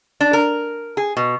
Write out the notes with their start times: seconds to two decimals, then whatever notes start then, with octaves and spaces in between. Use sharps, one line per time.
0.21 D4
0.33 A#4
0.97 G#4
1.17 B2